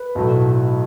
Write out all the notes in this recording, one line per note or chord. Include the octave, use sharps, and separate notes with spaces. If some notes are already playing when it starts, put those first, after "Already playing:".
Already playing: B4
B1 A2 F#3 A3